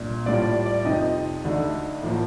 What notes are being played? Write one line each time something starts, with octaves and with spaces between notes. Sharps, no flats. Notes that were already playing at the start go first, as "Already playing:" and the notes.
Already playing: C2 A#2 D4
A2 G3 A#3 F4 D5
D5
D5
F2 C3 F3 C4 D#4 D#5
D2 D3 A3 D#4
A2 F3 A#3